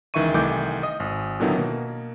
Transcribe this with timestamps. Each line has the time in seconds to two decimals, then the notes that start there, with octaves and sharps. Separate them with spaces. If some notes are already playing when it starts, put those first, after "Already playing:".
0.14 C#2 D#3 E3 E5 C#6 D#7
0.34 C2 D#3 E3 A3 D6 G6
0.83 D#5 D#6
1.00 G#1
1.40 A#2 D3 D#3 F#3 B3 E4
1.56 B2 A#3